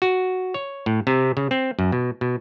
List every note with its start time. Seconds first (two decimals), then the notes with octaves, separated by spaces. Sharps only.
0.02 F#4
0.54 C#5
0.86 A2
1.07 C3
1.37 C#3
1.51 C4
1.79 F#2
1.92 B2
2.21 B2